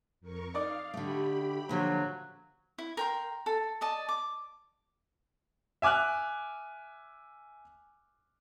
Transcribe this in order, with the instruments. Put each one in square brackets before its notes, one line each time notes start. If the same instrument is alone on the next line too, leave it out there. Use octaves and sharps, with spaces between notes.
[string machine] F2 A#4 C#6
[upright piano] D#4 D5 D6 [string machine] F5
[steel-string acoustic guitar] D3 A3 [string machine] G4 B5
[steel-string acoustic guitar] A#2 D3 F3 [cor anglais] F#3
[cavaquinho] E4
A#4 G5 C6
A4
D5 D#5 A5
D6
[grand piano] E5 G#5 D6 F6 F#6